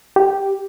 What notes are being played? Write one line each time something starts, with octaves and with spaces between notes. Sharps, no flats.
G4